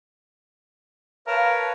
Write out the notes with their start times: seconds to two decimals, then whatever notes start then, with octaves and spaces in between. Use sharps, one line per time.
1.27 A#4 B4 C#5 F5 A5